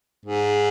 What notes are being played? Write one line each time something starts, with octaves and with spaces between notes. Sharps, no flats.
G#2